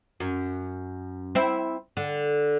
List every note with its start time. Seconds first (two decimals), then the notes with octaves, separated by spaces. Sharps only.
0.20 F#2
1.35 C4 E4
1.97 D3